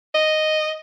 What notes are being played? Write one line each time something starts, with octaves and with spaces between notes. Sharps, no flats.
D#5